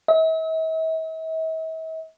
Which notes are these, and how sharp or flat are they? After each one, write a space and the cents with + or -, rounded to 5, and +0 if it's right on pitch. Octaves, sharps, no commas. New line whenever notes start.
E5 -45